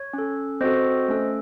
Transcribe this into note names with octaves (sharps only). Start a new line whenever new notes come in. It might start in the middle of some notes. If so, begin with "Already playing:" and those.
Already playing: C#5
C#4 A4
C4 F#4 A4 C5 D#5
A3 C#4 A4